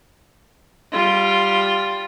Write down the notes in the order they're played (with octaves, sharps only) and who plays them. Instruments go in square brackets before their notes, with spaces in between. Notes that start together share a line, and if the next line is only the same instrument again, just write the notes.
[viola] G3 F4